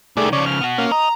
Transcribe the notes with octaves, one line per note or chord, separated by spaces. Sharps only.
C2 D#3 A3 G#4 D5
C#3 F3 C#5 D5
F6
B3 F#4
A#3 C#4 F5
D#5 A#5